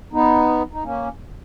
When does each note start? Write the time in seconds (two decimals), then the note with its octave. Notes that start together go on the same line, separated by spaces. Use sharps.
0.13 B3 D#4
0.73 D#4
0.84 A#3 C#4